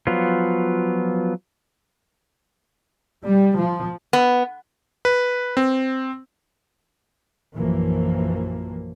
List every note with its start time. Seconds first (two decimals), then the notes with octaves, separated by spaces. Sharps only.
0.07 F3 F#3 B3 F4
3.25 G3
3.61 F3
4.13 B3
5.05 B4
5.57 C4
7.55 A#1 F#2 E3 F3 A#3